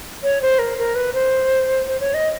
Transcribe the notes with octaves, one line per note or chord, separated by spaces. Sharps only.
C#5
C5
A#4
A#4
B4
C5
C5
C#5
D#5